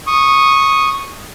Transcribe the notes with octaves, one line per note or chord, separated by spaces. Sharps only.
C#6 D#6